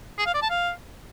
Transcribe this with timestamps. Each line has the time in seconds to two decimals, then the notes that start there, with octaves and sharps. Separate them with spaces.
0.18 G#4
0.26 F5
0.34 D5
0.42 A5
0.50 F5